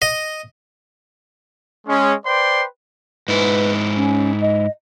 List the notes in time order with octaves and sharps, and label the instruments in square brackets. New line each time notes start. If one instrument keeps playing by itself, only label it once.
[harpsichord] D#5
[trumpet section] G#3 C#4
B4 C5 D5 G5 C6
[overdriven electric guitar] G#2 E4 [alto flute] B4
[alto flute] C#4
D#5